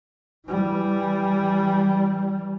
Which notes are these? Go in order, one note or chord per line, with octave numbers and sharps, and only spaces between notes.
E3 G3